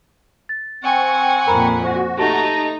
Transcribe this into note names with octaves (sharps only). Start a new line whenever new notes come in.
A6
C4 F#5 G#5 C#6
F2 A#2 A#4 A#5 B5
F#4 C5
A3 D#4 G4 A5 A#5 A#6